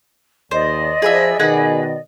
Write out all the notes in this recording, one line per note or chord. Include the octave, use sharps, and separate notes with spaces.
D#2 C5 D5 D#5
F3 G#4 B4 E5
B2 D#3 G#4 B4 F#5